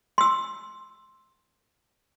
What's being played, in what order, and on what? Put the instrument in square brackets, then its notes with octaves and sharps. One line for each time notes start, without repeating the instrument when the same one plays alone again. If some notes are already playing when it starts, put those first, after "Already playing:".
[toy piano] C6 E6